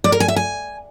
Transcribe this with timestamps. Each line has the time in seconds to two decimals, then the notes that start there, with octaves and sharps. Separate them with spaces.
0.04 D5
0.12 A#4
0.20 G#5
0.28 E5
0.36 G#5